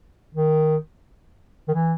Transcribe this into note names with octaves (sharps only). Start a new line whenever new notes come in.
D#3
D#3
E3